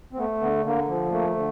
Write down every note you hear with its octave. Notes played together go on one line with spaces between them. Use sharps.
C4
A3 B3
D3 B3
D3 A#3
F3
A3 A#3
D3